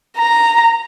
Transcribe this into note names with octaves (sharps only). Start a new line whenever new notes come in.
A#5